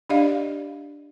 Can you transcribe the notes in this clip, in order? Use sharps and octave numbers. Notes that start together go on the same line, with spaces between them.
D4 G4 D5 D#5 F5